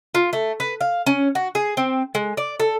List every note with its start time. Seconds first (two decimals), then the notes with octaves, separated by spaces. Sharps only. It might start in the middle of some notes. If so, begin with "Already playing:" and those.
0.15 F4
0.33 A3
0.60 B4
0.81 F5
1.06 C#4
1.35 F#4
1.55 G#4
1.77 C4
2.15 G#3
2.37 D5
2.60 A4